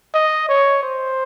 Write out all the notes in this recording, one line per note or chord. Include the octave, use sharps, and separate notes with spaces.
D#5
C#5
C5